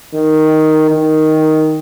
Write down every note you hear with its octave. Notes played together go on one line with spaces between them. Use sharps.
D#3
D#3